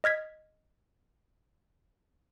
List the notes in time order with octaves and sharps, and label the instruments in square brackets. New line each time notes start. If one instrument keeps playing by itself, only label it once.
[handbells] D#5 F6 G#6 B6